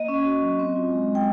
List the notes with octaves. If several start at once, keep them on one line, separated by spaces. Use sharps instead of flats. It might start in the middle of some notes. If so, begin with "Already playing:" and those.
Already playing: A#3 D#5
C#4
F#4
F#3
C4
F4
G#3
G#3
G5